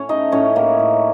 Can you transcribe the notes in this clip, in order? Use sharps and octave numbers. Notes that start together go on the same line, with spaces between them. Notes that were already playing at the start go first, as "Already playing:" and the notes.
Already playing: A2 C#4 C#5
A3 D#4 D#5
A2 C#4 C#5
A2 A#3 A#4
A2